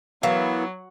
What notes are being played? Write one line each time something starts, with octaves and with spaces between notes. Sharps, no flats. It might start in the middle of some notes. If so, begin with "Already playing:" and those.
E3 F#3 B3 A#4 F5